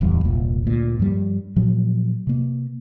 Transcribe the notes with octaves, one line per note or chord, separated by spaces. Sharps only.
D1 E2 G3
E1 C2 A#2
D2 A#2
G2 F3 G3
A#2 F3 F#3
C3 A#3